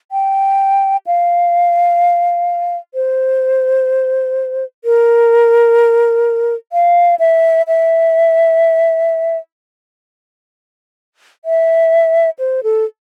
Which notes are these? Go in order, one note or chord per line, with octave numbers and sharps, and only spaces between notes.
G5
F5
C5
A#4
F5
E5
E5
E5
C5
A4